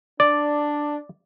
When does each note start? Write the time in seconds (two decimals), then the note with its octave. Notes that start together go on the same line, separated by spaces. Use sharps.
0.20 D4 D5